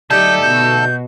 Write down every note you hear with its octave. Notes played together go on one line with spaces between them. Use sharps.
D3 F#3 A3 D#4 G4 A4 G6
B2 F#4 G6